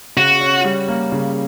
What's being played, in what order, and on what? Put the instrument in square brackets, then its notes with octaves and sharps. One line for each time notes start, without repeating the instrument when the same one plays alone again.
[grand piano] C#3 [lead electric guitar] F#4
[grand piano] C#4
G3
A#3
C#3